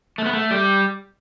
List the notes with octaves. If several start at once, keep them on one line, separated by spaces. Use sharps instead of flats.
A3
B3
A3
G3